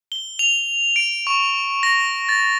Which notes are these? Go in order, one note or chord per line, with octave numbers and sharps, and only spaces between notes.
G7
F7
D7
C#6
A#6
A6